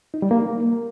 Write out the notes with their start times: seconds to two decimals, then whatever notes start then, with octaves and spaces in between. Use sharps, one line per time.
0.14 D#4
0.22 G3
0.31 A#3